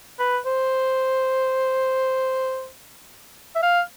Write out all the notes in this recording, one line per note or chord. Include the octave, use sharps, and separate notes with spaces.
B4
C5
E5
F5